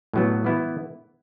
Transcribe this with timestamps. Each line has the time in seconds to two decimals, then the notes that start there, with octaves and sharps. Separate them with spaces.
0.13 A2 F#3 B3
0.44 E3 B3 E4